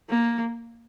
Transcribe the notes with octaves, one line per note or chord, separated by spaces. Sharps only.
A#3